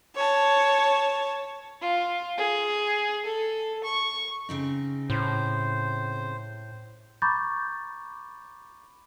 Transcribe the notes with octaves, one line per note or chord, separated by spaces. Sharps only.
C#5 A5
F4
G#4
A4
C#6
C#3 C4 D#4
A2 C5
A#5 B5 C#6 D6 G6 A6